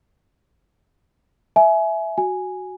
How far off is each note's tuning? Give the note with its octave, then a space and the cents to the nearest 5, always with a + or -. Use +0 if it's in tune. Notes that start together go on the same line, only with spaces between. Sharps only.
E5 +0 G#5 +25
F#4 +0 G#5 +0